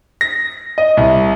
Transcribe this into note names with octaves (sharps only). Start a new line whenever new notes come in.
A#6
D#5
C2